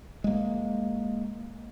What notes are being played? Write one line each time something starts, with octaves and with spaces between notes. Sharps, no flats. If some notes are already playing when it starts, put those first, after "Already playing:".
G#3 A#3